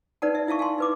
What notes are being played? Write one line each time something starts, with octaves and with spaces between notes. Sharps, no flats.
D#4 B4 D5 F#5 A5
E5
E4 E5 F5 A5 C#6
F5 G#5 A5 C6
D#4 B4 D6